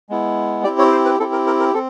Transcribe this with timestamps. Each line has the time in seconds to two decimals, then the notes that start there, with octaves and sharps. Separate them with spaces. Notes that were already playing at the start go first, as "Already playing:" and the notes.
0.09 G#3 B3 E4
0.64 C4 E4 G4 D5
0.79 C#5
0.92 C5
1.05 B4
1.20 C4 E4 G4 A4
1.32 A#4
1.47 A#4
1.60 A#4
1.74 C4 A4